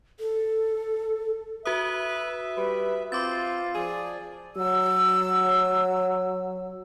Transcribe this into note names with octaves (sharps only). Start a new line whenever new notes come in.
A4
F#4 B4 E5 D#6
G3 B4
C4 F4 D6 A6
F3 G#4 D5
F#3 E6